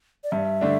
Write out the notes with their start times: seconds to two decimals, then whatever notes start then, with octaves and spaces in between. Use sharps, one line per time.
0.24 D5
0.31 G2 E5
0.61 D3 A3 D4